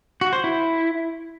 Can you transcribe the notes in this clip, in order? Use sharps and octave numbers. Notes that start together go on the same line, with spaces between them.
F#4
C5
E4